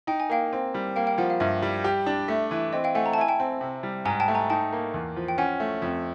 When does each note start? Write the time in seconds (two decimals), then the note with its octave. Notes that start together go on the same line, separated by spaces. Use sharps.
0.07 D#4 G5
0.20 G#5
0.30 A#3 F5 G5
0.53 C4
0.74 G3
0.96 A#3 F5 G5
1.07 F5 G5
1.18 F3 F#5
1.30 F5
1.40 G2 E5
1.62 G3
1.84 G4
2.06 D4
2.28 A3 E5
2.51 E3
2.73 C4 D#5
2.84 F5 G5
2.95 A3 F#5 G#5
3.06 A#5
3.13 A5
3.18 E4 G#5
3.28 G5 A5
3.40 C4
3.61 C3
3.83 G3
4.05 G#2 G#5 A#5
4.20 G5 A5
4.28 A3
4.35 G#5 A#5
4.50 D#4 G5 A5
4.73 A#3
4.94 E2
5.16 F3
5.28 G5
5.38 C#4 F#5 G#5
5.60 A3
5.82 F2